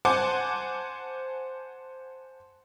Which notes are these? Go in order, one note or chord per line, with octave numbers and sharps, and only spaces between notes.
C5 F#5 G#5 A5 D6